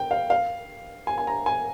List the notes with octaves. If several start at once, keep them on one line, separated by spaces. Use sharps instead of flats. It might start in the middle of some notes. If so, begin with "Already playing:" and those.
Already playing: G5
F5
F5
G#5
G#5
A#5
G#5